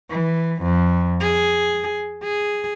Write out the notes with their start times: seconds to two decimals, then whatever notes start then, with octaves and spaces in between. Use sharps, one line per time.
0.10 E3
0.63 F2
1.21 G#4
2.24 G#4